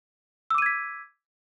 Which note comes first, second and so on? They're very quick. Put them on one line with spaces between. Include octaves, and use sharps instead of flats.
E6 D6 D#7 G#6 B6